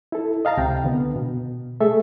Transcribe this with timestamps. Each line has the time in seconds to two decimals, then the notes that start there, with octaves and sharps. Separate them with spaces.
0.12 E4 A4
0.45 D#5 F5 A5 A#5
0.57 C#2 C3 G5
0.84 D3 B3
1.16 B2
1.81 A3 G#4 A4 E5